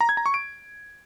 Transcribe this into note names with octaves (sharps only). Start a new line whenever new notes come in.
A#5
G#6
A#5
C#6
D7